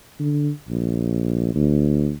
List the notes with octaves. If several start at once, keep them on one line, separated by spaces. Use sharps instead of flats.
D3
A#1
D2